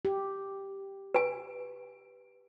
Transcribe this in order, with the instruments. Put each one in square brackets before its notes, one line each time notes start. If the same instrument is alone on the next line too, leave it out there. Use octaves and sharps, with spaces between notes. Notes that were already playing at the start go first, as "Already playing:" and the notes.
[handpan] G4
[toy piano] B4 G#5